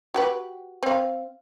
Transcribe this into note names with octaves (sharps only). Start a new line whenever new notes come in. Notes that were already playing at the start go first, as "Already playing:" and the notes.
F#4 G4 B4
C4 F5